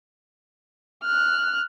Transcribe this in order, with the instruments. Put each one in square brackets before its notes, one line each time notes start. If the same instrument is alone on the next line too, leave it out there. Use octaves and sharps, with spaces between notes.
[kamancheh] F6 F#6